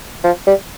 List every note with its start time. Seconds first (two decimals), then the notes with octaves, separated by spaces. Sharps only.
0.24 F3
0.47 G3